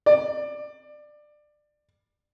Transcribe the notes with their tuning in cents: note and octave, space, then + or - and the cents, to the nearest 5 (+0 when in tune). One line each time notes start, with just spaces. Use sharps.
D5 +20